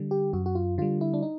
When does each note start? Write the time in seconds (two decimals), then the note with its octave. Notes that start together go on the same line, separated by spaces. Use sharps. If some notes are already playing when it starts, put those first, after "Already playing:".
Already playing: D3 G3
0.11 G4
0.33 F#2 F#4
0.46 F#4
0.55 F4
0.78 D3 G3 F4
1.01 E4
1.14 D4
1.23 D#4